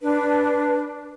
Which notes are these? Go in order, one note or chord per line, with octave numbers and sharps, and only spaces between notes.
D4 B4